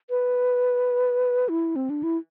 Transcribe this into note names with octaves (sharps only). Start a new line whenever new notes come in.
B4
E4
C4
D4
E4